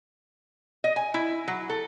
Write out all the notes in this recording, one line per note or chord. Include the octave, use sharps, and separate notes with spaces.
D#5
G#5
E4
F#3
A4